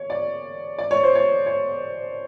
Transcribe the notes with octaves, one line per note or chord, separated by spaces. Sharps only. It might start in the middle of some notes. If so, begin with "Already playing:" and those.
Already playing: C#5
D5
D5
C#5
C5
C#5
C#5